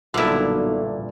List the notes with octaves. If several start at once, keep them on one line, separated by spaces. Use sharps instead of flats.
B1 G2 A#2 D3 A3 E4